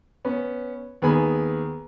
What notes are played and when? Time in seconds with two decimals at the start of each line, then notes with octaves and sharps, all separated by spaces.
0.25 B3 C#4
1.02 D#2 B3 G#4 G#5 B5